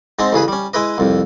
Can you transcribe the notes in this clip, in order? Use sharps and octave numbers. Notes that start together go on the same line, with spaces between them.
G#2 G#3 C4 D#4
A1 C#3 G#4 B4
G3 C#4
G#3 E4 B4 D#5
C2 F2